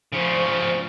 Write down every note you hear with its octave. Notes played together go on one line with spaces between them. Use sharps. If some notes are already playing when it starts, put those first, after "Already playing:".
C#3 F3